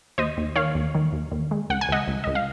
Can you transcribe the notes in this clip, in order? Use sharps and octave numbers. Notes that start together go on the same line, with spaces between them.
D#2 C5 D#5
D#2
D#3 C#5 F5
D#2
D#3
D#2
D#2
G#3
C#2 F#5
G#5
C#2 D#5 F#5
C#2
C#2 D#5
F5